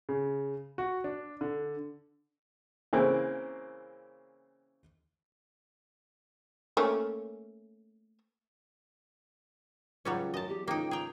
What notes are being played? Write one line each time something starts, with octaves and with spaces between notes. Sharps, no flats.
C#3
F#4
D4
D3
C#3 E3 A#3 C4
A3 A#3 C#4
C#2 F#3 G3 C#4
F#2 D#5 A5
E2 G4
C#2 A#3 D#4 G5
G#4 G5 A#5